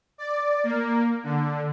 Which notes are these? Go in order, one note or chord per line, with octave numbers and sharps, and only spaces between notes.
D5
A#3
D3